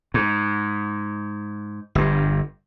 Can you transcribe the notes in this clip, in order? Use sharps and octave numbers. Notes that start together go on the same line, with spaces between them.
G#2
G1 G2